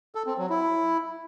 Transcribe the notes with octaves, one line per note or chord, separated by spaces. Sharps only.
A4
C4
F#3
E4